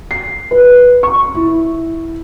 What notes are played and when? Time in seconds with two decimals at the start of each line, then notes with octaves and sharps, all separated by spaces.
0.11 C7
0.51 B4
1.03 C#6
1.35 E4